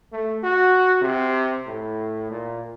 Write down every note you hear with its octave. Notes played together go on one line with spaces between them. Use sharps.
A3
F#4
C3
A2
A#2